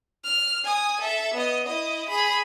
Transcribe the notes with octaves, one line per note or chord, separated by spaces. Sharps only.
F6
G#5 D#6
A4 E5
B3 D#5
E4 D#5
G#4 B5